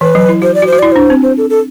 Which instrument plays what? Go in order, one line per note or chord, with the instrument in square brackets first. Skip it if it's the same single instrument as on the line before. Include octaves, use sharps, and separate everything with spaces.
[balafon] E3 [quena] B4
[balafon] F#3
E4
[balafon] F#4 [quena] C5
[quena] D5
[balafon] F#4
[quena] C5
[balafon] F#4
[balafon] E4 [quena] D5
[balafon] D4 [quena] C5
[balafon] C4
[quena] C5
A4
A4